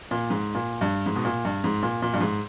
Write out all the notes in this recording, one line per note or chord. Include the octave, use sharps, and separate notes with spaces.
A#2
G#2
A#2
G2
G#2
B2
A#2
G2
G#2
A#2
A#2
G2
G#2